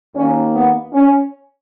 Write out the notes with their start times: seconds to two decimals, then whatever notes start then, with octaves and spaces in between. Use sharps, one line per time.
0.14 D#2 D#3 A#3 C#4
0.54 B3
0.93 C#4